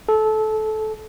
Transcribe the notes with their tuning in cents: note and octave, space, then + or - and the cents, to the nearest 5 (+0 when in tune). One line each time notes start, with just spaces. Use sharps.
A4 -20